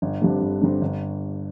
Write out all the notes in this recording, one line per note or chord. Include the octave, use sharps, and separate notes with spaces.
G1
G2 D3 G3 C4
G1
G2 D3 G3 C4
G1